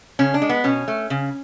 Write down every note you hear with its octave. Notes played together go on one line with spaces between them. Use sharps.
C#3 C#4
D4
G#3
B3
B2 C#4
A3
C#3